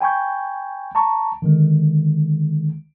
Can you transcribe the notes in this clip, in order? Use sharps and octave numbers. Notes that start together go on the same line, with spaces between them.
G5 G#5 B5 C#6 G6
A5 A#5 C#6
D3 D#3 G#3